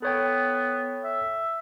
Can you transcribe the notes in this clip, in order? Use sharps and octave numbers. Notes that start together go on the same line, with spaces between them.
B3 A4 C#5 G5
E5